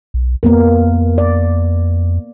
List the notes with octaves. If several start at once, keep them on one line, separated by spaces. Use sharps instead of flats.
B1
F2 A#3 B3 A#4
D5